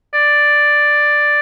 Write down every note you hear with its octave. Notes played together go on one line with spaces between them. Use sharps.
D5